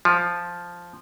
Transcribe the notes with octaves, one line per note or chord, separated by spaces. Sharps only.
F3